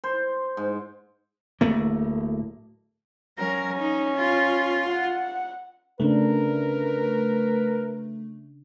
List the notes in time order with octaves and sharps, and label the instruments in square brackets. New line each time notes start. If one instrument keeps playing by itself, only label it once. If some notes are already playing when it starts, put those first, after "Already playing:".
[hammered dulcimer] C5
G#2
[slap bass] D1 A3 A#3
[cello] F#3 A#4 [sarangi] C#4
[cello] D#4
F4
[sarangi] F#5
[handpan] C#3 C#4 D4 [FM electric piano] A3 [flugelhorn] A#4 [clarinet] B4